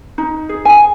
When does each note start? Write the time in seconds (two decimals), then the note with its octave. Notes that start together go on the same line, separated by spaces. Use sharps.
0.18 D#4
0.49 G#4
0.65 G#5